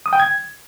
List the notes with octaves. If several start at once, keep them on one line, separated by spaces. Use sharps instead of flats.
D#6
G5
G#6